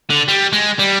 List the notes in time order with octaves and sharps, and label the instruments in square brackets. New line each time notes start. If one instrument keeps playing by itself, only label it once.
[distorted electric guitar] D3
G3
G#3
G3